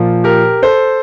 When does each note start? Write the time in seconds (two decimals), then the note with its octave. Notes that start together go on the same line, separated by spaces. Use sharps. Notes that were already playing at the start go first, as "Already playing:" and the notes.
Already playing: A#2 F3
0.24 G4 A#4
0.62 A4 C5